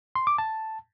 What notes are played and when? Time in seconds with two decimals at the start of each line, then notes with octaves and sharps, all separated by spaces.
0.15 C6
0.27 D6
0.38 A5